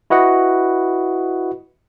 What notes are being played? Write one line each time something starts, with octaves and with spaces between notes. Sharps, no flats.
E4 F#4 B4 D#5 F#5